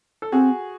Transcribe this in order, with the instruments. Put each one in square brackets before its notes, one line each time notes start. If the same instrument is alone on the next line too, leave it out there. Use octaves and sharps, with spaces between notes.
[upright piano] A4
[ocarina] C4 [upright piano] F#4 G#4